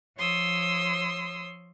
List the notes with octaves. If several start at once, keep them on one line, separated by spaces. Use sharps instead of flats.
F3 C#5 C6 D#6 E6